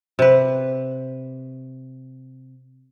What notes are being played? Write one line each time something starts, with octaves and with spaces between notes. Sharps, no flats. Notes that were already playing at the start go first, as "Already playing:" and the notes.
C3 B4